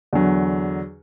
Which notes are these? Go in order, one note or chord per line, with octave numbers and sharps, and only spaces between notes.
E2 D3 F#3